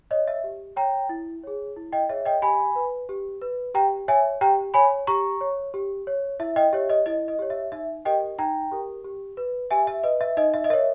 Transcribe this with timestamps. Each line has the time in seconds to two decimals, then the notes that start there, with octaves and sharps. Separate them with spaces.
0.11 C#5 D#5
0.28 E5
0.44 G4
0.76 C#5 G5 A#5
1.09 E4
1.43 G#4 C#5
1.76 E4
1.92 D#5 G5
2.09 G#4 C#5 E5
2.26 D#5 G5
2.42 G4 G#5 B5
2.76 B4
3.09 G4
3.41 B4
3.74 G4 G5 A#5
4.08 C#5 E5 G#5
4.41 G4 G5 A#5
4.74 C#5 G#5 B5
5.07 G4 A#5 C#6
5.41 C#5
5.74 G4
6.07 C#5
6.40 E4 E5
6.56 D#5 G5
6.73 G4 C#5 E5
6.90 D#5
7.06 E4 D#5
7.28 D#5
7.39 G4 C#5
7.50 E5
7.72 D#4 E5
8.05 G4 A#4 D#5 G5
8.39 D#4 G5 A#5
8.72 G4 A#4
9.04 G4
9.37 B4
9.71 G4 E5 G#5
9.87 E5
10.03 B4 D#5
10.21 E5
10.37 D#4 D#5
10.54 E5
10.64 D#5
10.70 A#4 E5
10.73 C#5